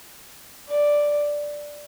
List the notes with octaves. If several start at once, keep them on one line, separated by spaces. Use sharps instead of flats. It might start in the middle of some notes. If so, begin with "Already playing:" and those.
D5